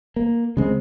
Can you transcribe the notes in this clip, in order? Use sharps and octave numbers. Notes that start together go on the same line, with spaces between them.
A#3
C#3 G#3 C4